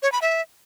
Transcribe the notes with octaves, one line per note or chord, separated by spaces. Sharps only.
C#5
B5
E5